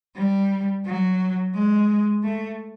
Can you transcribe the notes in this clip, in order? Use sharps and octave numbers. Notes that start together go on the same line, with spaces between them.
G3
F#3
G#3
A3